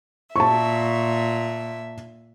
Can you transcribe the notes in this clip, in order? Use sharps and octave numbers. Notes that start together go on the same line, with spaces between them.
A#2 E5 A5 C#6